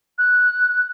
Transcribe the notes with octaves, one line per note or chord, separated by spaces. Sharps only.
F#6